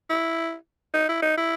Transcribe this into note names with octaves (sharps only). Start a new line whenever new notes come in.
E4
D#4
E4
D#4
E4